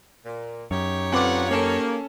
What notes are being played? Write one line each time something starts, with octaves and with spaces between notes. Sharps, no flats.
A#2
F#2 D#4 G4 C#5
D3 C4 F4 B4 F#5 D6
A#3 C#4 A4 E7